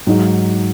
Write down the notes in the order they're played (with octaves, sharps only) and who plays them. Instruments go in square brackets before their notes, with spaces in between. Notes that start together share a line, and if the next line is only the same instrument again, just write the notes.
[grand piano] G#2 F#3 D#4 G#4